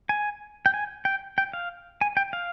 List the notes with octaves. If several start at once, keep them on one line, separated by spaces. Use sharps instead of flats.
G#5
G5
G#5
G5
G5
F5
G#5
G5
F5